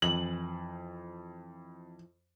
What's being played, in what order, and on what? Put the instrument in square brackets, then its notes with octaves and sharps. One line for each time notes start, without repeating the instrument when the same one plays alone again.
[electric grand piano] F2 [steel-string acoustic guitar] E3 F3 [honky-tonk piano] F#7